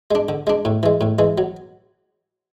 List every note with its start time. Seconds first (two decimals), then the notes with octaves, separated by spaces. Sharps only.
0.11 G#3 D4
0.29 D3
0.47 G#3 D4
0.65 A2
0.83 E3 G#3
1.01 A2
1.19 E3 G#3
1.38 F#3